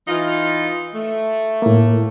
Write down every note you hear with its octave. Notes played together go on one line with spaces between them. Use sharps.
E3 D#4 F4
A3
A2 A#3